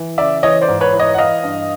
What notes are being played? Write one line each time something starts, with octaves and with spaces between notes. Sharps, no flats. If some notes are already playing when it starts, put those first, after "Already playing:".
Already playing: E3
C#3 D5 E5
E3 C#5 D#5
C5 D5
G#2
B4 C#5
E3
C#5 D#5
F#5
E3 D#5 F5
G2